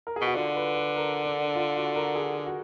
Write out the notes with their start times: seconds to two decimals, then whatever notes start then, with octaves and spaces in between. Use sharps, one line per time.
0.07 A#4
0.16 G#4
0.21 B2
0.26 F#4
0.35 D3 F4
0.56 B4
0.76 B4
0.96 A#4
1.25 D4
1.55 F4
1.76 F#4
1.96 A#4
2.16 G#4
2.46 F#4